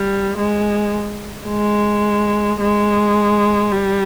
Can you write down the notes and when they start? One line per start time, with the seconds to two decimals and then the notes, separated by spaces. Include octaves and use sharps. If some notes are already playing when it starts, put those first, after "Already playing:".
Already playing: G3
0.38 G#3
1.48 G#3
2.60 G#3
3.72 G3